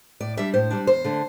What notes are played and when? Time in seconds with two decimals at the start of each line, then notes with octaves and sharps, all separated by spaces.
0.20 A2 D5
0.37 G3 D4 E5
0.54 A2 C5
0.71 G3 D4
0.87 E2 C5
1.04 D3 A3 D4